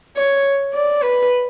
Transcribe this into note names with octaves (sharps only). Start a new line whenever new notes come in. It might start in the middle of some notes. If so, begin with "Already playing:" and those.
C#5
D5
B4